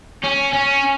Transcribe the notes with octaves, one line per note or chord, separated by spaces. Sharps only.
C#4
C#4